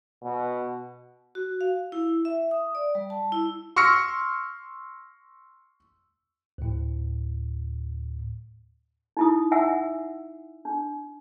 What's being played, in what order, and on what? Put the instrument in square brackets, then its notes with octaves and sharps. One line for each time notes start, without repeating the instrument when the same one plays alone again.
[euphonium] B2
[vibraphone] F#4
F5
E4
E5
D#6
D5
G3
A5
E4
[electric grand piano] C6 C#6 E6 F6 A#6 C#7
[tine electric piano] D2 A2
[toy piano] D#4 E4 D#6
E5 F#5 G#5 E6
D4